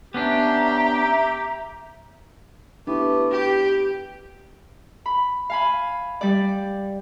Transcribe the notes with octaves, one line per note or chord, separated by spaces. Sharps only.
B3 C#4 D4 G4 E5 A#5
A3 B3 D4 E4 G4
G4 G5
B5
F5 G#5 B5
G3 D5